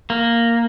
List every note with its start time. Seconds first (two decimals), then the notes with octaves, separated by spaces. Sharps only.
0.10 A#3